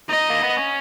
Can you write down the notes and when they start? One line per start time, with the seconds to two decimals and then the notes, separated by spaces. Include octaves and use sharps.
0.09 D#4 D#5
0.30 A#3
0.43 B3
0.57 C#4